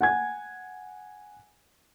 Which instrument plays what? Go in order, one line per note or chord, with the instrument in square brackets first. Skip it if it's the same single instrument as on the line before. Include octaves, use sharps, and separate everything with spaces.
[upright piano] F#5 G#5 G#6